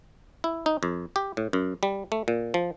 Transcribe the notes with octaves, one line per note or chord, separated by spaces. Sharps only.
E4
D#4
F2
G4
A2
F#2
G3
A3
A#2
F3